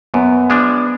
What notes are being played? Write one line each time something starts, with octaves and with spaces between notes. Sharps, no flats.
F#2 B3
F3 G#3 D4